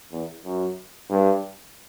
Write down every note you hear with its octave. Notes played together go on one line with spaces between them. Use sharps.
E2
F#2
G2